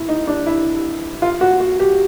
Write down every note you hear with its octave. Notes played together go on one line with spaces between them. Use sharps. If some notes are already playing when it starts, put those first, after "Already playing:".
Already playing: E4
D#4
D4
E4
F4
F#4
F#4
G4